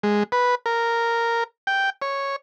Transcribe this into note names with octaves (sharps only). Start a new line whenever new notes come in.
G#3
B4
A#4
G5
C#5